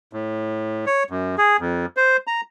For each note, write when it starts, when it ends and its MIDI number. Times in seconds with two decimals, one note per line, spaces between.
0.13 0.85 45
0.86 1.03 73
1.10 1.35 42
1.38 1.57 68
1.60 1.86 41
1.97 2.17 72
2.27 2.41 82